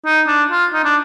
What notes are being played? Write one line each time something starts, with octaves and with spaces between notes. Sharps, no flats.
D#4
D4
F4
D#4
D4